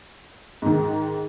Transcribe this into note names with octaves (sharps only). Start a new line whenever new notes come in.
G#2 D#3